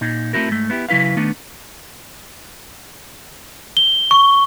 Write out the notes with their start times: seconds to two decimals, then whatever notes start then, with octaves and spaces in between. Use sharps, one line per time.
0.01 A#2 D#4
0.33 A3 B3 C4 E4 F#4 A#4
0.48 G#2 A3
0.70 B3 E4 G4
0.89 C#3 F#3 E4 B4 F5
1.17 D#3 A3 B3 D4
3.77 G7
4.11 C#6